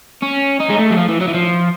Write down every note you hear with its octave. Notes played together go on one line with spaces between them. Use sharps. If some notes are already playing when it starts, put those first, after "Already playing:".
C#4
D#4
G#3
A3
F#3
F3
E3
F#3
E3
F3